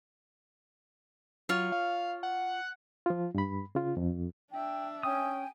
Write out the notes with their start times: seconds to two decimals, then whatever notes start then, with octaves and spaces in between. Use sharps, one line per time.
1.49 F#3 F4 C#5
1.72 F5
2.23 F#5
3.06 F3 F4
3.35 G2 B5
3.75 C#3 F4
3.97 F2
4.52 D4 E5 G5
5.03 C#4 G5 G#5 D#6